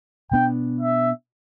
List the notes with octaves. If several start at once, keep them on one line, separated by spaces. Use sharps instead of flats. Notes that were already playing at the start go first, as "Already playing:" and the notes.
B2 B3 D4 G5
E5